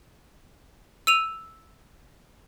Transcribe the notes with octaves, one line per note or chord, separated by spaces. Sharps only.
E6 D#7 F7